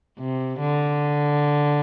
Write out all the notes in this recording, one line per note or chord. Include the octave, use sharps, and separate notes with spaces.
C3
D3